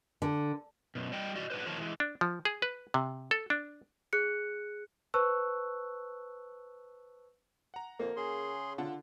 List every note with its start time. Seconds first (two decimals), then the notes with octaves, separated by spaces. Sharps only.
0.22 D3
0.95 F#2 B2
1.12 G3 D#5 G5
1.35 F#4 D5 D#5
1.50 F#3 D4 B4 C5
1.65 D#3 F3 F4 A#4 C#5 A5
1.78 E3 G#3
2.00 D4
2.21 F3
2.45 G#4
2.62 B4
2.94 C3
3.31 A4
3.50 D4
4.13 G#4 F#6 C#7
5.14 B4 C5 A5 C#6 E6 F#6
7.74 F#5 A#5
7.99 F2 A#3
8.17 C#3 G#4 C6
8.78 D3 F4 F#5 A5